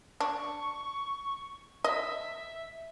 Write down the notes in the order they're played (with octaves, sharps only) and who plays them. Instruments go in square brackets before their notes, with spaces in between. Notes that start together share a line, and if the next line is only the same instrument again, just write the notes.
[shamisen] D4 [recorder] C#6
[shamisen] D#5 [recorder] E5